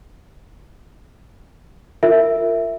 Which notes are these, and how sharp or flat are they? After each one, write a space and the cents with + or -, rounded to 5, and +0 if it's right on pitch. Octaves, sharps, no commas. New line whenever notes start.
F4 +0 A#4 -25 E5 +0